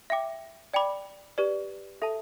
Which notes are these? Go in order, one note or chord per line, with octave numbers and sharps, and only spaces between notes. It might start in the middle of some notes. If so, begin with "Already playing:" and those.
E5 G5 D6
D5 G5 B5 D6
G4 B4 D5
A4 E5 A5